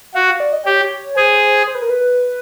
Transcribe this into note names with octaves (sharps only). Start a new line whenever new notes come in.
F#4 F5
F5
D5
D#5
G4 C#5
G#4 C5
C5
B4
A#4
B4